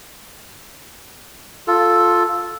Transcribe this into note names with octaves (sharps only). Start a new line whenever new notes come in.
F4 A4